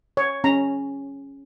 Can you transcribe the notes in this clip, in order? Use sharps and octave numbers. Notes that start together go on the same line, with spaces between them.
C#5
C#4 A#5